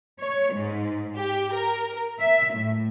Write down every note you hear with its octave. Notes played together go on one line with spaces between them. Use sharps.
C#5
G#2
G4
A#4
E5
A2